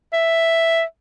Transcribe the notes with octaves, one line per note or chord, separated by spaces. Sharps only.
E5